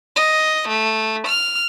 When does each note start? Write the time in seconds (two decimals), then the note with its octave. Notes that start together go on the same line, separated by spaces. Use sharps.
0.16 D#5
0.68 A3
1.27 F6